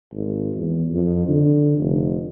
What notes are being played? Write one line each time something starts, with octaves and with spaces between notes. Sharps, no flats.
G#1
E2
F2
D3
F1